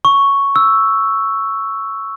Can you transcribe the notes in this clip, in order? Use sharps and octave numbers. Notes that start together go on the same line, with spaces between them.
C#6
E6